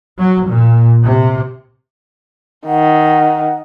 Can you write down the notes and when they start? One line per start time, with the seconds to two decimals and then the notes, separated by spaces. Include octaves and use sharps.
0.19 F#3
0.48 A#2
1.04 C3
2.67 D#3 F#5